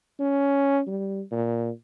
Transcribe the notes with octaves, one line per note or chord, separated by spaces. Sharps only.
C#4
G3
A#2